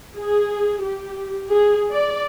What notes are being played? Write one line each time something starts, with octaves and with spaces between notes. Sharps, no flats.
G#4
G4
G#4
D5